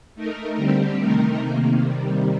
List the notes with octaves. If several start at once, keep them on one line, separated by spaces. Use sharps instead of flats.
A3 D#4 A#4
D3 G3 C4 G4
C3 D#3 A3 D#4 A#4
C3 D#3 A#3
C3 D#3 G3